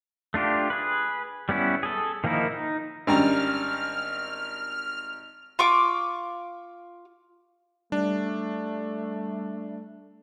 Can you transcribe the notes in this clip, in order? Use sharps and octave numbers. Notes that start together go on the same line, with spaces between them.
A3 D4 F4 G4
G#4 B4
G3 B3 C#4 E4
G#4 A4
D#3 F3 A#3 D#4 E4
D#4
G#1 G3 C#4 D4 A#5 F6
F4 C#6 D6
G3 A3 D4